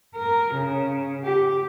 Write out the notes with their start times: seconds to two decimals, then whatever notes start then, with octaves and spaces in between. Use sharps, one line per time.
0.16 A#4
0.55 C#3
1.24 G4